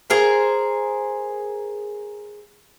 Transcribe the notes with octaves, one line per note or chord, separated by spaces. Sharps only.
G#4 A#4 C5